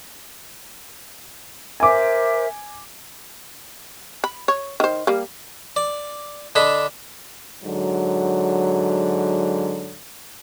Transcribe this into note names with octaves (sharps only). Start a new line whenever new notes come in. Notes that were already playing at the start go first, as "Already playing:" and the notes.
A#4 C5 E5 G#5 D6
B5
C#5
D#3 C5
G3 A#3
D5
D3 D4 D#5 B5
G#2 D3 F#3